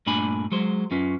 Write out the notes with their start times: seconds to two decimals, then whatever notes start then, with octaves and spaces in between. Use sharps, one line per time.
0.07 G2 A#2 A3 D4 G#5 B5
0.52 F#3 G#3 C5
0.91 F#2 C#4 F4 B4